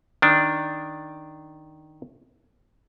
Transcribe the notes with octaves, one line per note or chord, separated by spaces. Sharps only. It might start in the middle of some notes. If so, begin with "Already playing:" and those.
D#3 D4